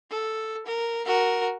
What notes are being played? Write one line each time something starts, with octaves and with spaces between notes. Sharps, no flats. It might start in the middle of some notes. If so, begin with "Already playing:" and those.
A4
A#4
F#4 A#4